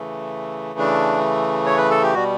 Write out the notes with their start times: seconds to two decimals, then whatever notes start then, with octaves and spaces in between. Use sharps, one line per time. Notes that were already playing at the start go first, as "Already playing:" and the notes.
Already playing: C#3 E3 A3
0.79 D4
1.66 C#5
1.78 B4
1.90 A4
2.03 G4
2.14 B2 G3 F#4